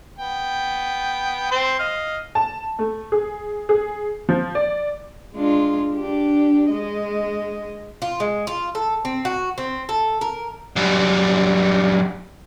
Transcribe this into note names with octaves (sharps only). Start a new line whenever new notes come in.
B3 G5
C4 C5 C6
D#5 F5
A5
A3
G#4
G#4
F3
D5
G#3 D4 F4
D4 G4
G#3 D#5
F4
G#3
F4
A4
C4
F#4
C4
A4
A#4
F#2 G3